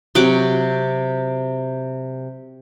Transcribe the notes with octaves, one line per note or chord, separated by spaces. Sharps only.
C3 F#3 F#5 D6